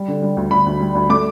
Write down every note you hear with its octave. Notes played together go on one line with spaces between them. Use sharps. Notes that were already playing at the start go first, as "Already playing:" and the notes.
Already playing: G3
D3
G3
D2
D2 B5
D2
G3
D2
A3 D6